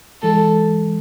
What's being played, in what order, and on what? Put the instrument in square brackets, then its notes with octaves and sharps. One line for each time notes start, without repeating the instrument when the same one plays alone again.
[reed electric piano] E3 G#3 [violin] A4